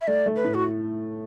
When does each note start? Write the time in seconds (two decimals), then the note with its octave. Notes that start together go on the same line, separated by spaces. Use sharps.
0.01 E5
0.07 A3 D5
0.26 A3
0.36 B4
0.44 A2
0.54 F#4